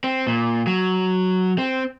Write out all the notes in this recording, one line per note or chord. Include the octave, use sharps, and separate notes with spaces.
C4
A#2
F#3
C4